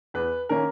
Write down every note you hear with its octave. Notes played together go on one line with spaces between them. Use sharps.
E2 B4
D#3 A#3 C#4 A#4